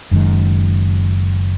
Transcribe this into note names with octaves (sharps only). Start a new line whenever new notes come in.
F#1 F#2 D#3 G#3